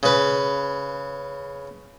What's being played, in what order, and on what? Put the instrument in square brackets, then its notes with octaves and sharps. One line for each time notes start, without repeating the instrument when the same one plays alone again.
[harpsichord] C#3 B4